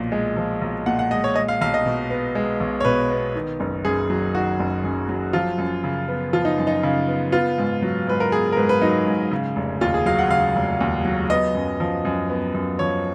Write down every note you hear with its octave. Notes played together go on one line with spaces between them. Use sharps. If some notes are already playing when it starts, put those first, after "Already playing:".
Already playing: B1 A#2 F3
G#3
F3
B1
A#2 F#5
F#5
G#3 D#5
C#5
G#3 D#5
F5
B1 F5
D#5
B2
B3
G#3
B1
C#5
B2 B4
B3
D#3
F#1
F#2 G#4
F#3
D#3 F#4
F#1
F#2
F#3
F3 F4
F#2
C#3
B3
F3 F4
D#4
F#2
D#4
C#3
B3
B3 F4
G#2
F#3
G#2 B4
A#4
B3 G#4
A#4
G#2 B4
B4
F#3 D#4
G#2
C#3
F1
D#2 F4
G#4
F#3 F5
F#5
C#3 F5
F1
D#2
F#3
B3 D#5
F#2
F3
F#2
B3
F#2
F3 C#5